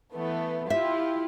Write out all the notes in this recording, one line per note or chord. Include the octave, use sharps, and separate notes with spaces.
E3 A3 B3
E4 F4 G4 E5